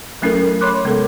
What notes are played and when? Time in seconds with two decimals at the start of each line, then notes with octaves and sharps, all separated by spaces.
0.22 F#3 A3 C#4 E4 A4 A#4
0.61 C#5 B5 C6 D6 F#6
0.84 C3 G#3 B3 A4 A#4